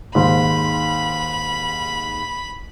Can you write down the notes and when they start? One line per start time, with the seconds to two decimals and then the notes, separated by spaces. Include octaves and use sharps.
0.15 D#2 G#2 B5